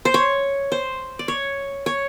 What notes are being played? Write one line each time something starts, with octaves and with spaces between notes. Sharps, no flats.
C5
C#5
C5
D5
C#5
C#5